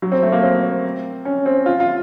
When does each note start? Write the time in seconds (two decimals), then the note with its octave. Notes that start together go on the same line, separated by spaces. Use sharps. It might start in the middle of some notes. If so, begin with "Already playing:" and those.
0.02 F#3
0.12 C4
0.23 A3
0.32 A#3
0.43 C4
1.25 C#4
1.46 C4
1.66 F4
1.80 F4